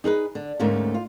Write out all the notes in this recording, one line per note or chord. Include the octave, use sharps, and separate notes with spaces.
D#4 G#4 A#4 B4
D3
D2 G#2 A3 A#3 C#4
F4